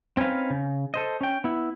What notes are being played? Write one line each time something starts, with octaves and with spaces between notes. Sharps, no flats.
C4 C#4 D#4 B4 F5
C#3
A4 C5 D#5
C#4 G5
B3 E4